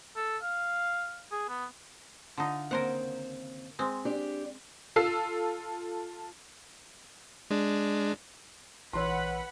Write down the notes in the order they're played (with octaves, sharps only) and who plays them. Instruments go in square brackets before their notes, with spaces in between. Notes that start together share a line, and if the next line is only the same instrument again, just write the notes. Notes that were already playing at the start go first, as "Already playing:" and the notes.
[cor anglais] A4
F5
G#4
B3
[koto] D3 D#4 [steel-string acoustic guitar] F4
[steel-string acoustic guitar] D#2 C#3 C4 [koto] A#4 C5 F#5
[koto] G#3 C4
[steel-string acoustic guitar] D4 G4 D5
[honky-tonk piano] F4 A4 E6 C7
[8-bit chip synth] G#3 D4
[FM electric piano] A#1 E3 E6 [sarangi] B4 [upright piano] C#5 C6 [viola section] F#5 B5